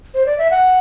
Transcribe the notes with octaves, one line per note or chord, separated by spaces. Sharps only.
C5
D5
E5
F#5